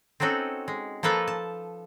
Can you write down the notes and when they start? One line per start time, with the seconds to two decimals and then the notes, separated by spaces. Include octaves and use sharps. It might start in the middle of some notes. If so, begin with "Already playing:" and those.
0.20 C4 C#4 D#4 F#4 A4
0.68 G#3
1.03 F3 A#3 A4 B4 A5 A#5
1.28 A5